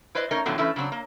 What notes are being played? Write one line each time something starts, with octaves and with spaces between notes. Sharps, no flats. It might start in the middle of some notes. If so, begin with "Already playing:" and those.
E4 B4 C5 D5 D#5
A3 C#4 D#4 A#4 C#5 D#5
A2 D3 F3 F#3 B3
E3 A3 C#4 E4
C#3 F#3 C4 D4
A#3